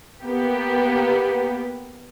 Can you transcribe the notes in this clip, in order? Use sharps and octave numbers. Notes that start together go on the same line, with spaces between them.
A#3 B3 G4